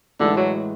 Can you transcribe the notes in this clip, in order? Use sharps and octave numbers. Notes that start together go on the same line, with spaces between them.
A2 D3 E3 G#3
F#3